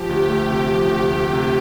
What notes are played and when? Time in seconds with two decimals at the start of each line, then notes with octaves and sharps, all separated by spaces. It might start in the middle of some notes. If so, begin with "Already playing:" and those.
Already playing: F3 G4
0.09 D2
0.30 A3
0.50 C3
0.71 F3
0.91 D2
1.13 A3
1.33 C3